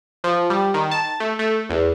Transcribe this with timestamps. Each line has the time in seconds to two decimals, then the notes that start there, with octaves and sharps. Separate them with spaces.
0.24 F3
0.50 G3
0.74 D#3
0.91 A5
1.20 A3
1.39 A3
1.70 E2